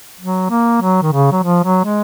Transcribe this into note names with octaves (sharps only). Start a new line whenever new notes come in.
F#3
A#3
F#3
D#3
C#3
F#3
F3
F#3
G#3